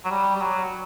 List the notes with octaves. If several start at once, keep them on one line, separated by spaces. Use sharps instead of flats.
F#3
G3
G3
F#3